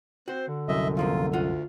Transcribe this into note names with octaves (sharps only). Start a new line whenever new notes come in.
C4 F#4 C5
D3
C2 F#2 D#5 E5
E2 F3 A#3 F4
D2 F4 F#5